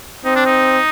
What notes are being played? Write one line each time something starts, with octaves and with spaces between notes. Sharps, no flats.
C4 D#4
D4
D#4